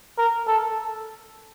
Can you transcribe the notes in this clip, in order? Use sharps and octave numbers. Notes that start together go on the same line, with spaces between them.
A#4
A4